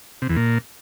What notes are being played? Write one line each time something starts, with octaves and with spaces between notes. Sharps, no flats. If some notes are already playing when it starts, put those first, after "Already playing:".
C3
E2
A#2